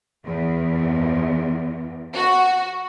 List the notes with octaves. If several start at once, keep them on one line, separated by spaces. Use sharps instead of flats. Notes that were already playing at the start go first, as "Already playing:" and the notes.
E2
F#4